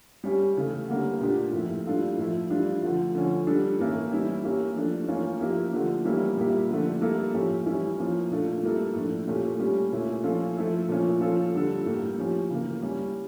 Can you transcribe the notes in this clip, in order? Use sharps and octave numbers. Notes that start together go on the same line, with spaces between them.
G3 C#4 G4
C#3 E3 A3
D3 G3 A#3 C#4
A#2 A3 D4 G4
A2 F3 A#3 E4
G3 D4 F4 A4
A2 F3 A3 E4
E3 G3 D4 F4
D3 F3 A3
D3 F3 C#4
G3 D4 A4
A2 E3 A#3 C#4 E4
E3 G3 C#4 E4 G4
E3 A#3 C#4 G4
F3 A3 D4
E3 A#3 C#4 F4 A4
F3 A#3 E4 G4
D3 F3 A3 D4 G4
E3 G3 A#3 C#4 E4
A#2 G3 A#3 E4 G4
D3 F3 A3 D4
G3 A#3 E4 A4
A2 F3 C#4 G4
E3 G3 C#4 E4
F3 A#3 C#4
A#2 A3 D4 F4
G3 A#3 E4 A4
A2 F3 A3 D4
A#2 A3 C#4 G4
G3 C#4 G4
A#2 A3 C#4 E4
F3 C#4 F4 A4
F3 A3 E4 A4
A#2 F3 C#4
F3 C#4 F4 A4
D3 G3 D4 A4
A2 G3 A#3
F3 C#4 G4
C#3 E3 A#3
G3 C#4 G4